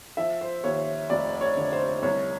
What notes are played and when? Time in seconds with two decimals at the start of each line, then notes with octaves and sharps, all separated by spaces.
0.17 F3 E5
0.41 C5
0.64 D#2 C#5
1.10 F1 D5
1.41 C#5
1.56 D3
1.73 C5
2.03 C2 C#5